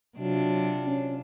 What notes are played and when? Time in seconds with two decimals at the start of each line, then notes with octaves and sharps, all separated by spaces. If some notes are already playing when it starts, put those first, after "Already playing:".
0.18 C3 F#3 D4 F4
0.85 C#4